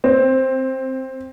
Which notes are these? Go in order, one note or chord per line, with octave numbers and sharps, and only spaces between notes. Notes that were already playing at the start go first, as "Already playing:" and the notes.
C4